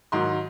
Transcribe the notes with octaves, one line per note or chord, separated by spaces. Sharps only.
G#2 D#3 F#3 C6